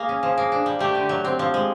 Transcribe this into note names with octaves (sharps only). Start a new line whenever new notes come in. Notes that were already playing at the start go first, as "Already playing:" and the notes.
Already playing: A#3 G#4
C#4
F3
A#3
D4
G3
A3 G4
D3
F#3
C4 G4
F3
G#3